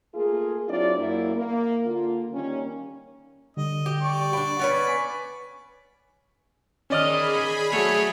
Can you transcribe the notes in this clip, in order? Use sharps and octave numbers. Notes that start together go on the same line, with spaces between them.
A3 A#3 F4 G#4
F#3 C4 D4 E4 F4 D5
F#2 A#3 E4
A#3
D3 A#3 F4
D#3 G3 A#3 C#4
D3 G3 D#5
G4
D5 C#6
D4 G5 B5 D6
B3 C#4 B4
G#5 B6
D#3 C#4 G#4 D5 D#5 B5 F6
F#3 A3 C#5